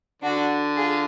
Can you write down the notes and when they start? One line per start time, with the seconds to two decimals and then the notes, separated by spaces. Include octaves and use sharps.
0.22 D3 D4 F#4
0.76 F4 G#4